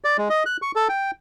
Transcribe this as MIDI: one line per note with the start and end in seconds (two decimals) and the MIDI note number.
0.04 0.17 74
0.18 0.29 56
0.30 0.43 75
0.46 0.57 90
0.62 0.72 85
0.76 0.88 69
0.89 1.11 79